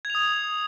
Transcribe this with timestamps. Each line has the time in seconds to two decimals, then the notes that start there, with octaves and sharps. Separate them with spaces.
0.05 G#6
0.10 F7
0.15 D#6